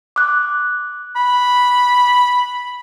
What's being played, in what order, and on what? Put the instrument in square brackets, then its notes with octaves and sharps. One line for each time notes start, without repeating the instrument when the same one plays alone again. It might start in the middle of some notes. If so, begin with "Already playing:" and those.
[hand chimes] D6 F#6
[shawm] B5